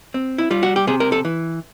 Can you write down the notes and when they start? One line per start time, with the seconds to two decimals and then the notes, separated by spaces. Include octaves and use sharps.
0.14 C4
0.38 E4
0.51 G3 F4
0.63 F#4
0.76 G4
0.87 C3 G#4
1.00 A#4
1.12 A4
1.25 E3